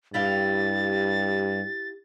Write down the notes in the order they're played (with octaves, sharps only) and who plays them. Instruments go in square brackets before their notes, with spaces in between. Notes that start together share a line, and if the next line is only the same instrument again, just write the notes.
[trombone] G2 [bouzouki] E4 G4 F5 [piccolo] A6